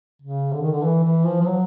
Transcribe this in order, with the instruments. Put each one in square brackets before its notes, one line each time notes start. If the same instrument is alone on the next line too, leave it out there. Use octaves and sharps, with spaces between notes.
[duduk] C#3
D3
D#3
D3
E3
E3
F3
F3
F#3